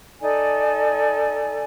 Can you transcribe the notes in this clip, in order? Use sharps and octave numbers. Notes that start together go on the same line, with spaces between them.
D#4 A4 D5 G#5